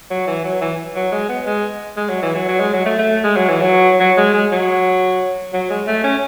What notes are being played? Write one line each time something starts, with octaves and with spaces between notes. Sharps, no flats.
F#3
E3
F#3
E3
F#3
G#3
B3
G#3
G#3
F#3
E3
F#3
F#3
G#3
F#3
A3
A3
G#3
F#3
E3
F#3
F#3
G#3
G#3
F#3
F#3
G#3
A3
C#4